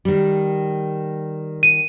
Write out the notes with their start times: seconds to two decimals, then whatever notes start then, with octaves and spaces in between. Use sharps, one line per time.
0.05 D#3 G3
1.63 D#7